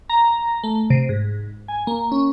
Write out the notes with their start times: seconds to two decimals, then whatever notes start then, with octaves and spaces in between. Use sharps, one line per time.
0.09 A#5
0.63 A3
0.90 C3
1.09 G#2
1.68 G#5
1.87 A#3
2.12 C#4